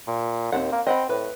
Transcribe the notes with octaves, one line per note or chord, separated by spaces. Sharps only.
A#2
D#2 C4 F4 F#5
A#3
C4 D#5 F#5 B5
A2 B4